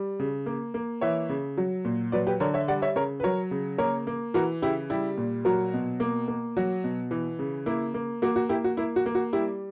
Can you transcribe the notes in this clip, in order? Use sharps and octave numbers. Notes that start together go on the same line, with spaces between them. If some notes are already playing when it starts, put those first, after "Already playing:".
Already playing: G3
C#3
A#3
A#3
E3 C#5 E5
C#3
F#3
A#2
F#3 B4 D5
G4 B4
D3 A#4 C#5
C#5 E5
G3 D5 F#5
C#5 E5
C#3 A#4 C#5
B4
F#3 A#4 C#5
C#3
A#3 A#4 C#5
A#3
E3 F#4 A#4
C#3 E4 G4
G3 E4 G4
A#2
F#3 F#4 A#4
B2
A#3
A#3
F#3 F#4
B2
E3
C#3
A#3 E4
A#3
A#3 F#4
F#4
A#3 E4 G4
F#4
A#3 E4
F#4
A#3
F#4
G3 E4 G4